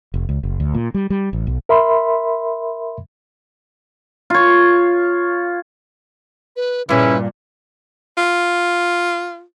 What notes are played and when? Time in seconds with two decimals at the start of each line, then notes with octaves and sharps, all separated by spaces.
0.14 F1
0.29 C#2
0.43 F#1
0.60 D2
0.75 A#2
0.94 G3
1.10 G3
1.33 A1
1.47 B1
1.69 A#4 E5 B5 C6
4.30 F4 C#5
6.56 B4
6.89 G2 A#2 C#3 C#4 E4 B4
8.18 F4